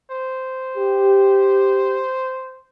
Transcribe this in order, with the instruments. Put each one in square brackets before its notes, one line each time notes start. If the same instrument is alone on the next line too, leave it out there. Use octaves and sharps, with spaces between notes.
[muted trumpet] C5
[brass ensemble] G4